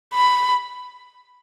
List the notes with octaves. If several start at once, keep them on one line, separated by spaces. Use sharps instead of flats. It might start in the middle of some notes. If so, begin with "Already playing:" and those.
B5